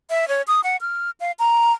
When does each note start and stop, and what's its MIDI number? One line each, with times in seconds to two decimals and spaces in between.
0.10 0.28 76
0.28 0.42 73
0.48 0.61 87
0.64 0.77 78
0.81 1.10 89
1.20 1.32 77
1.39 1.72 82